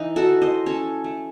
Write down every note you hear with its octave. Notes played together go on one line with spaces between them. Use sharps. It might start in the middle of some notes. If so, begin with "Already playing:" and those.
Already playing: E3 D#4
F#4 A4
E3
C5 D#5
C#4 A4 C#5
A3